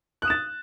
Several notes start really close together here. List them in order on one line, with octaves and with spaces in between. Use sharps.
F#6 D#6 E7 A6